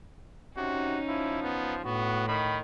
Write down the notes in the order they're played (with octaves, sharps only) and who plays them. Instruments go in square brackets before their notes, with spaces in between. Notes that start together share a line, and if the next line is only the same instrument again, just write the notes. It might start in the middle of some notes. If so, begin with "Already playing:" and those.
[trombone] C3 [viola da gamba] C#4 D#4 [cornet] F#4
[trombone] F3 [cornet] E4
[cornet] B3
[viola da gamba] A2 [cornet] B3 [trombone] F#4
[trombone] D#3 [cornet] B5